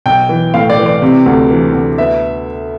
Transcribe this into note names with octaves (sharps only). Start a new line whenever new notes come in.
B1 G5
E3
A2 F5
D5
E3
D5
C3
D2
E3
D2
B3 E5